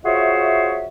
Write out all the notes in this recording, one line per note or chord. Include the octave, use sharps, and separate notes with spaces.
F4 F#4 G#4 C5 C#5 E5